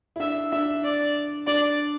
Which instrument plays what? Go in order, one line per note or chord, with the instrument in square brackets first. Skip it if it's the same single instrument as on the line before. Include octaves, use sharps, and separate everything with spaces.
[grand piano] E4
[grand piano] D4 [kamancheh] E5
[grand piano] D4 [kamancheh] E5
[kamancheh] D5
[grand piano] D4 [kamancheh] D5